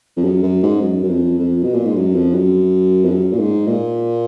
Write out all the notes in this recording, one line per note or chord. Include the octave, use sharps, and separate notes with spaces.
F2
F#2
F#2
G#2
F#2
F#2
F2
F2
B2
A#2
G#2
F#2
F2
F#2
F2
F#2
A#2
G#2
A#2